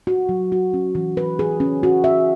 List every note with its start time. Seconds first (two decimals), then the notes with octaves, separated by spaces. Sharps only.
0.07 F#4
0.29 F#3
0.52 F#4
0.74 C#4
0.95 E3
1.17 B4
1.39 G#4
1.60 C#4
1.83 F#4
2.04 E5